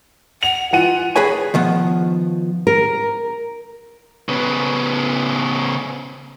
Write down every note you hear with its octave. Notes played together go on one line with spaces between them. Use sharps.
F#5 F7
E3 F4 F#5 D#7
G#4 B4 C#5 G#5
D#3 F3 B3
A#4
C#3 B3